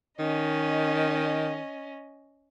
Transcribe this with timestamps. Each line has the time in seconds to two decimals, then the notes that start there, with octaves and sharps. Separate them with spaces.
0.19 D#3 C#4 D#5